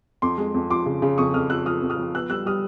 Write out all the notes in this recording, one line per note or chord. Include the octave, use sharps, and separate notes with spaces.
F2 C6 D6
G#3
F2
F3 C6 D6
C#3
C#3
F2 C#6 D#6
F2 D#6 F6
F3 E6 F#6
F3 D#6 F6
F2
D#6 F6
F3
B3 E6 F#6
G3 E6 F#6
G3 D#6 F6